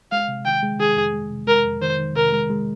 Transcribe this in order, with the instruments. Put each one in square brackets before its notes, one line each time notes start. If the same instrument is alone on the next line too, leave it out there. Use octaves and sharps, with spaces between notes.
[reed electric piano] G#3 [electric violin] F5
[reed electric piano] C3
[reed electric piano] D#3 [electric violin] G5
[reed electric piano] G#3
[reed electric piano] D#3 [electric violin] G#4
[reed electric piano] F2
G#3
C3
[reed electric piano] G#3 [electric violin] A#4
[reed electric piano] F2
[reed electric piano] D#3 [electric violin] C5
[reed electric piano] D#3
[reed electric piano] C3 [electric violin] A#4
[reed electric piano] G#3
G#3